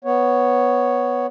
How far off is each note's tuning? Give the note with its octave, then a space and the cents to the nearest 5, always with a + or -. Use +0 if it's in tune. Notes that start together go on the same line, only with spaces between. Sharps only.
B3 +0 C#5 +0